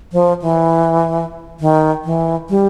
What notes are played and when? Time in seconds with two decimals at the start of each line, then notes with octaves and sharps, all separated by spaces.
0.13 F3
0.42 E3
1.60 D#3
2.05 E3
2.49 G3